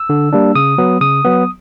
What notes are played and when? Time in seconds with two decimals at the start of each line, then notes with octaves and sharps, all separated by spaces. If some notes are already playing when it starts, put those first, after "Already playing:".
Already playing: E6
0.09 D3
0.33 G3 A#3 D4
0.55 C#3 D#6
0.78 F#3 B3
1.01 C#3 D#6
1.24 F#3 B3